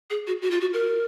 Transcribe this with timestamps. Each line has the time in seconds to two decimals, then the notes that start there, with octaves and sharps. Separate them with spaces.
0.10 G#4
0.27 F#4
0.42 F#4
0.51 F4
0.61 F#4
0.73 A#4